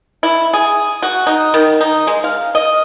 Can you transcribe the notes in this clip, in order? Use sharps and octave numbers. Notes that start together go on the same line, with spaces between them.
E4
G#4
F#4
D#4
D#3
D#4
G#3
F5
D#5